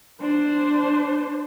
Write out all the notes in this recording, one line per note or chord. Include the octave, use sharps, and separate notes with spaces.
D4 C5